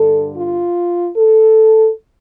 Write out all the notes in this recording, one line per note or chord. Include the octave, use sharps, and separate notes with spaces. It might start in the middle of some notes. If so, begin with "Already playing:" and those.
Already playing: G2 D3 A4
F4
A4